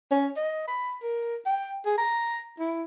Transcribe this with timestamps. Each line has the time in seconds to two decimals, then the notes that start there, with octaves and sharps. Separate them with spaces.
0.11 C#4
0.37 D#5
0.67 B5
1.02 A#4
1.46 G5
1.86 G#4
1.98 A#5
2.59 E4